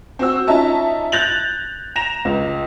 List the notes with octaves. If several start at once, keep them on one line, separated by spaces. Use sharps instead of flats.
C4 F#4 E6
C#4 D#4 F4 E5 A5 A#5
F#6 G6 A6 A#6 F7 F#7
A#5 A#6 E7 F7
C#2